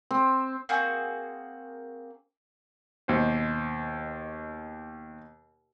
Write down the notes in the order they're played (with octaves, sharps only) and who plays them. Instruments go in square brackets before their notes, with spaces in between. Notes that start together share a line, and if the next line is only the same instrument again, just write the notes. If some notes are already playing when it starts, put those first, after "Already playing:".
[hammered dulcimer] C4
[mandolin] A#3 C4 F#4 G#4
[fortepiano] D#2 B2 C5